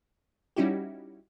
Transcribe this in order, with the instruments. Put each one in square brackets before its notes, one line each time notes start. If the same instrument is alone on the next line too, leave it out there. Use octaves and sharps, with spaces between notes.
[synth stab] G3 C#4 D#4 E4 F#4 G4